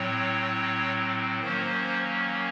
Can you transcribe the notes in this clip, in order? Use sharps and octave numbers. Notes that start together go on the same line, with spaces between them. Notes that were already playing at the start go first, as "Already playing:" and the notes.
Already playing: A2 F#3 C4 C#5
D#3 F#3 A#3 C#4 C5